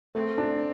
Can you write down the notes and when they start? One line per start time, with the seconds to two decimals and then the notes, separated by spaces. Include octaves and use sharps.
0.15 A3 C4
0.38 D4